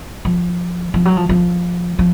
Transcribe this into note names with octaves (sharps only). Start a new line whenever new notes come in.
F3
F3
F#3
F3
F3
F3